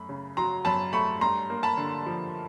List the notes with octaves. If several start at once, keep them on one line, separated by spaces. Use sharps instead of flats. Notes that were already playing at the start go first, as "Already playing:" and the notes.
Already playing: F#2 A3 B5
C#3
F#3 A#5 C6
F#2 A5 B5
A3 B5 C#6
G2 A#5 C6
A#3
A5 B5
D3
F3